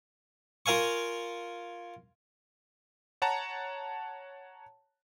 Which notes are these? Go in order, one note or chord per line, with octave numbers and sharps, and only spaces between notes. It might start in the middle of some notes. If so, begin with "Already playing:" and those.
F4 A#4 F5 G#5 C#6
C#5 F#5 A5 A#5